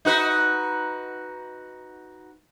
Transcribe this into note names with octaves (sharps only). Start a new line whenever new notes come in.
D#4 F#4 B4